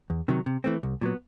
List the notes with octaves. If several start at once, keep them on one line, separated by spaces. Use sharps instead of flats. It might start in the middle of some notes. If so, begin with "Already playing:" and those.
E2
C3 D#3 F#3
C3
E3 A3 C4
C2
A#2 F#3 B3